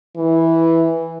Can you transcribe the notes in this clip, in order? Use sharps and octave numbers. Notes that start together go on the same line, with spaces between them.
E3